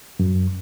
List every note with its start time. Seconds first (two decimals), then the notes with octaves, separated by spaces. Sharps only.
0.19 F#2